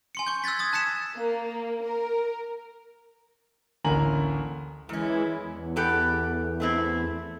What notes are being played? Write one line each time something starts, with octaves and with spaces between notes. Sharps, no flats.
G#5 C6 C#7
C#6 G6
E6 F#6 G#6 A6 B6
D#6 G#6 A6
A5 F#6 B6 C#7 E7
A#3
A#4
A1 D2 A#3 G#5 A#5 F#7
F#2 E3 G#3 C#4 E4
E2
B3 G4 A4
A3 C4 E4